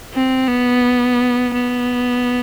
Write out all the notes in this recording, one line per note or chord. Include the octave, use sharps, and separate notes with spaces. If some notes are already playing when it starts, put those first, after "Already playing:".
C4
B3
B3